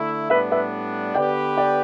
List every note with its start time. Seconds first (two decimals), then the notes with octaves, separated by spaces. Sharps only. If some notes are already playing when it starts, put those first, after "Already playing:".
Already playing: D3 A3 E4
0.30 A2 G3 B3 D4 B4 E5
0.52 B4 E5
1.15 D3 B3 G4 B4 D5 G5
1.57 D5 G5